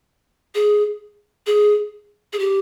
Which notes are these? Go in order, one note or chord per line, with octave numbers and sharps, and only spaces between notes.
G#4
G#4
G#4
G4